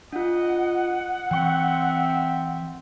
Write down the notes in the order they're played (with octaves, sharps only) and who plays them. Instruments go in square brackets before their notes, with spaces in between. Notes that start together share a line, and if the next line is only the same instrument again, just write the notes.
[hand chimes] D4 F4 [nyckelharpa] D#5 [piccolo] F#5
[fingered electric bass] E3 [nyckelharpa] C4 E5 [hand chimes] G5 C#6